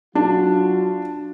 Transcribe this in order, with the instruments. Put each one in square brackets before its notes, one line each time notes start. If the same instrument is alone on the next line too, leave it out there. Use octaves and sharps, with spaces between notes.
[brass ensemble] F#3 F4 F#4 [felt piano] D4